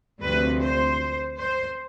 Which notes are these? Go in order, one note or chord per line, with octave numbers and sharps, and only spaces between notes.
D2 C3 F3 B4
C5
C5